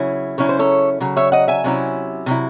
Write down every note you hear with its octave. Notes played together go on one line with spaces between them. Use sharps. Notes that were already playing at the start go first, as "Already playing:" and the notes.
Already playing: C#3 F#3 C#4 E4
C#3 F#3 C#4 E4 C#5
C5
A4 C#5
C#3 F#3
C#5 E5
D#5 F#5
E5 G#5
C3 F#3 C#4 E4
C3 F#3 E4